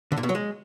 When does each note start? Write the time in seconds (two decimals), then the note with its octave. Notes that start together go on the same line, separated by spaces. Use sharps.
0.12 D3
0.17 A#2
0.23 B2
0.29 F#3
0.35 G#3